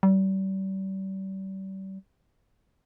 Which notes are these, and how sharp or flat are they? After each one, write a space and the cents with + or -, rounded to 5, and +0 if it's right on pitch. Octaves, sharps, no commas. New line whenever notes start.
G3 -35